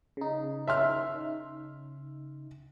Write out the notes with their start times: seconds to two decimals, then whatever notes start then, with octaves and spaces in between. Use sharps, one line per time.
0.17 C#3 D#4
0.68 E5 C6 F6